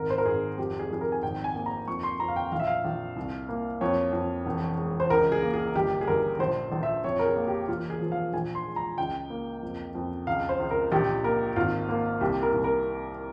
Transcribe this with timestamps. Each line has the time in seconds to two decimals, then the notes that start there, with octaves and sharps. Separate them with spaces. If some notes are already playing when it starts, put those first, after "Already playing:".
Already playing: G#1 A#4
0.10 C5
0.18 A#4
0.26 G#1 G#4
0.58 F2 G4
0.79 G#4
0.91 F2 G#4
1.01 A#4
1.12 G#5
1.23 G#1 G5
1.44 G#5
1.55 A#3 G#5
1.66 A#5
1.88 F2 C#6
2.03 C6
2.20 F2 A#5
2.28 F5
2.36 G5
2.52 A#1 F5
2.60 E5
2.67 F5
2.84 A#1
3.16 C2
3.49 A#3
3.81 F2 C#5
4.13 F2
4.46 E1
4.78 G#3
5.00 C5
5.10 C#2 A#4
5.32 G#4
5.43 A#3
5.54 G#4
5.75 G1 G4
6.01 G#4
6.07 G1 A#4
6.39 A#1 C5
6.72 A#1
6.83 E5
7.04 F2 C#5
7.19 A#4
7.25 G#4
7.36 A#3
7.47 G4
7.68 E1 F4
7.90 G#4
8.01 F3
8.12 F5
8.33 A#1 G#5
8.55 C6
8.66 G#3
8.76 A#5
8.98 C#2 G5
9.30 A#3
9.63 F2
9.95 F2
10.27 C#2 F5
10.49 C5
10.59 C#2
10.71 A#4
10.92 A#1 G4
11.24 A#3 A#4
11.56 G#1 F4
11.89 A#3
12.21 C2 G4
12.43 A#4
12.53 C2
12.64 A#4